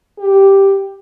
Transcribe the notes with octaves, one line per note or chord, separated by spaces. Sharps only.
G4